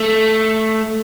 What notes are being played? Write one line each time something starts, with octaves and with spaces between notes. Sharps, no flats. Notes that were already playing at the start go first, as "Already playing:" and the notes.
Already playing: A3